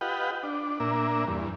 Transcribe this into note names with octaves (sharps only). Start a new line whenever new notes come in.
F4 G4 B4 D#5 F#5 G5
D4
A#2 A#3 D4 E5
E2 G2